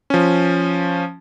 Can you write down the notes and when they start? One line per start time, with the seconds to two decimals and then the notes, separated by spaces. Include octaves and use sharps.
0.10 F3 C#4